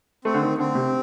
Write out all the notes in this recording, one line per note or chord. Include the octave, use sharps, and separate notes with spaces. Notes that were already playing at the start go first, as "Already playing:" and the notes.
A3 C4
D3
D#3
D3 C4
C3